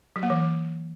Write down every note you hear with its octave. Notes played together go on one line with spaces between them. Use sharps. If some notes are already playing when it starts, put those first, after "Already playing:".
F#3
A#3
E3